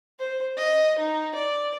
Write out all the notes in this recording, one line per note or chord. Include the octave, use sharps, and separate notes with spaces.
C5
D#5
D#4
D5